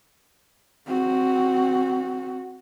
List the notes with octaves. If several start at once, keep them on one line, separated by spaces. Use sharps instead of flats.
C4 F#4